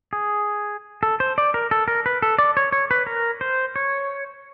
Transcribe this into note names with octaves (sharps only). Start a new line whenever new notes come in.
G#4
A4
C5
D5
A#4
A4
A#4
B4
A4
D5
C#5
C#5
B4
A#4
C5
C#5